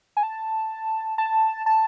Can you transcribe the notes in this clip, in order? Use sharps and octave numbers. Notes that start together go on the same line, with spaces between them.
G#5
A5
A5
A5